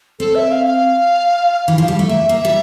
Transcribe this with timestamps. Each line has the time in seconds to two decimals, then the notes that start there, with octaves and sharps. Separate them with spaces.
0.20 C4 A4
0.35 E5
0.51 F5
0.67 F5
1.68 E3
1.78 F3
1.88 G3
1.99 A3
2.09 A#3 E5
2.29 A#3
2.40 G3 E5